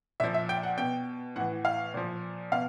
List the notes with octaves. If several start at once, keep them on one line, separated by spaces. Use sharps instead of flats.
A#2 F3 E5
E5
G5
F#5
B2 G5
A2 E3 F#5
F5
A#2 F3
B2 F5